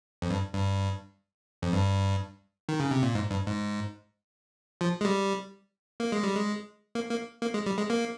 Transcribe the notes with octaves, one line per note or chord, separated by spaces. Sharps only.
F2
G2
G2
F2
G2
D#3
C#3
C3
A#2
G#2
G2
G#2
F3
G#3
G3
A#3
G#3
G3
G#3
A#3
A#3
A#3
G#3
G3
G#3
A#3